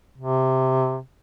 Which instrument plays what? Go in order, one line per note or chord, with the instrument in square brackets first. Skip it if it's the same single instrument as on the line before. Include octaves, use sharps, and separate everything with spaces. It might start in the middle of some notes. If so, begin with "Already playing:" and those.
[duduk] C3